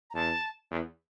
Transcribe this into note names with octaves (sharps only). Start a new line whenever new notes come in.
A#5
E2 A5
E2